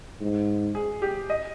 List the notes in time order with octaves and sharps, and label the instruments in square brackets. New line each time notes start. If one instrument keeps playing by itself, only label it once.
[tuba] G#2
[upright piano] G#4
G4
D#5